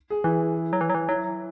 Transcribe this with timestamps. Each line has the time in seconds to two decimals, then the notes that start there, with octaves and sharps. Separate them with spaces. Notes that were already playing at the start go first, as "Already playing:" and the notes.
0.10 G#4
0.24 E3 E4
0.73 F#3
0.81 E3
0.90 F#3
0.95 E3
1.09 F#3 E4